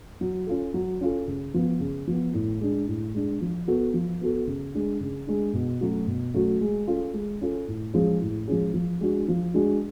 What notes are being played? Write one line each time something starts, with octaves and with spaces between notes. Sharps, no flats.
F#3
C#4 F4 A4
F#3
C#4 F4 A4
C#3
F3 B3
C#3
F3 B3
A2
G#3 D4
A2
G#3 D4
F3
B3 F#4 A4
F3
B3 F#4 A4
C#3
G#3 D4
C#3
G#3 D4
B2
F#3 A3 C#4 F#4
B2
F#3 A3 C#4 F#4
G#3
C#4 F4 A4
G#3
C#4 F4 A4
A2
F3 G#3 C#4 G#4
A2
F3 G#3 C#4 G#4
F3
G#3 D4 F#4
F3
G#3 D4 F#4